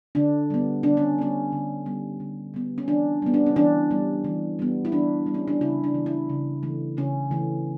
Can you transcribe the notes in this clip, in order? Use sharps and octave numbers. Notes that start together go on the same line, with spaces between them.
D3 D4
G3 B3
D3 D4
C#4
G3 B3 C#4
D3
G3 B3
D3
G3 B3
C#4
E3 D4
G3 B3
D4
C#4
E3 D4
G3 B3
E3
G3 B3
E4
E3 D4
G3 B3
C#4
D4
C#3 E4
D4
E3 A3
E4
C#3
E3 A3
C#3 C#4
E3 A3